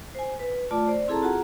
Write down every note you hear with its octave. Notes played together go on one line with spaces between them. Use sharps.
C5 G#5
B4
A3 F4 D5 A5 D6
C5 D5
C4 E4 G#4 A4 A5 A#5
F4 F#4 G#4 F#5 A#5